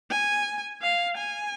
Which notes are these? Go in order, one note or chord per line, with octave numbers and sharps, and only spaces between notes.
G#5
F5
G#5